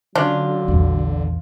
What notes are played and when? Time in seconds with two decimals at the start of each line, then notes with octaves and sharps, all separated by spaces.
0.15 D3 F#3 C#4 D4 F4
0.68 A#1 E2